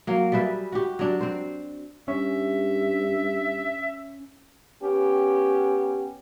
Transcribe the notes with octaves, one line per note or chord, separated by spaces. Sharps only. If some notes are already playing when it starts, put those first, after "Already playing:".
F#3 A#3
G3 G#4 B4 E5
F#4 G4
F#3 D4
C4 C5
G2 C#4 E5
B3 C#4 G4